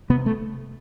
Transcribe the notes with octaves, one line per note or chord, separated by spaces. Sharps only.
C3 B3
A3